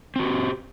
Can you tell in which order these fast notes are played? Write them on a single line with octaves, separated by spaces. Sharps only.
C4 F#4 G4